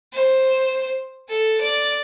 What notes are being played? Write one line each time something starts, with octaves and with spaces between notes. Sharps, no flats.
C5
A4
D5